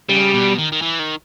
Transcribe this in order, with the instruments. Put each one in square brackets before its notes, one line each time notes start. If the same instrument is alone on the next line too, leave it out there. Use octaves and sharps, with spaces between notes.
[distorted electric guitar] C#3 [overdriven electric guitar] G3
[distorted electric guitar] B2
D#3
D#3
E3
D#3